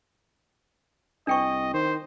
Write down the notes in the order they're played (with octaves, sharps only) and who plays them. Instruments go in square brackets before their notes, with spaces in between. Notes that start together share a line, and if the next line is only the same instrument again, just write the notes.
[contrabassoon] C2 [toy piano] D4 G5 C#6 [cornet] D#5
[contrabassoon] D#3 [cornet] C5